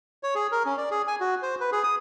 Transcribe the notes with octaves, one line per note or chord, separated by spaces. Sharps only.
C#5
G#4
A#4
C#4
D5
G#4
G#5
F#4
C5
B4
G#4
D#6